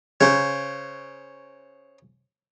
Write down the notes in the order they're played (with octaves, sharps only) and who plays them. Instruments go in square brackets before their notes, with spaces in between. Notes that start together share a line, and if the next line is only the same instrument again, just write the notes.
[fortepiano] C#3 [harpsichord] C5 C#5